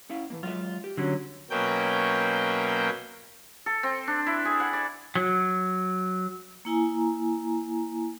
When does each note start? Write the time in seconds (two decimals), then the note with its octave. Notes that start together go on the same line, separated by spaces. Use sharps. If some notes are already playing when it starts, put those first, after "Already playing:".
0.10 C#4 E4 F5
0.30 A2 E3 A#3
0.43 F#3 G#3 F4 E5
0.84 G4
0.97 D3 F#3 C#4
1.50 B2 F#3 A#3 C#4 G5 G6
3.66 A4
3.83 C4
4.07 D4
4.26 E4
4.45 G#4
4.60 F#5
4.73 D5
5.15 F#3
6.65 A#3 E4 G#5 A#5